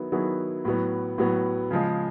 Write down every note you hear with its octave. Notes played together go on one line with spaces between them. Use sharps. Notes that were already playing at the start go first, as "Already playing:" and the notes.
Already playing: D#3 F#3 B3 E4 G#4
D#3 F#3 B3 E4 G#4
A2 F#3 B3
A2 F#3 B3
C#3 F3 G#3